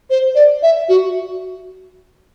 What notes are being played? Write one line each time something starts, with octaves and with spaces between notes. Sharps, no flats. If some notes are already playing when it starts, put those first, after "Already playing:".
C5
D5
E5
F#4